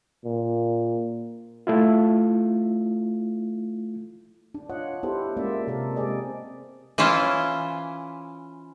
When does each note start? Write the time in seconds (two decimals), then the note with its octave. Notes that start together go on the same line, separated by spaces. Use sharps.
0.25 A#2
1.67 A3 E4 F4
4.54 D4
4.70 F4 C#5 D#5 F#5
5.03 B3 E4 G4 A4 C5
5.37 G#3 A#3 C#4 F4 D5 E5
5.67 C3 A4 A#4 D5
5.96 G#3 C4 G4 G#4 D5 D#5
6.98 E3 C#4 E4 F4 C5